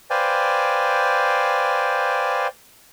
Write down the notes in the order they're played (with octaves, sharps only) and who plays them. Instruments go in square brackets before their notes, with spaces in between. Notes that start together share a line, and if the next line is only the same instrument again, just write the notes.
[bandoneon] B4 C5 D5 F5 G5 G#5